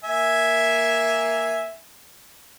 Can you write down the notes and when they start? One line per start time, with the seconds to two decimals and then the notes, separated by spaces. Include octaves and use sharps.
0.04 A#3 E5 G#5